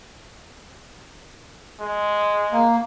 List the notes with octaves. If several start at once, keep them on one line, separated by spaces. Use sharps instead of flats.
G#3
A#3